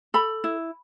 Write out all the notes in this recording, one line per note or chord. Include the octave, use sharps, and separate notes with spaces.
A4 B5
E4